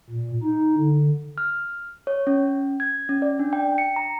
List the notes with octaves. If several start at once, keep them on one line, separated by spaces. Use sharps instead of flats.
A#2
D#4
D3
F6
C#5
C#4
G#6
C#4
D5
D4
G5
C#7
A#5